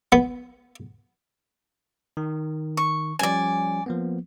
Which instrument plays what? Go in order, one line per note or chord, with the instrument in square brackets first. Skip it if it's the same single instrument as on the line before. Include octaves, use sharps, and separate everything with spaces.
[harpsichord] B3
[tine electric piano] D#3
[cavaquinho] C#6
[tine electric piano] F3 G3 C#4 [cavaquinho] D5 G#5
[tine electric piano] F3 A#3 B3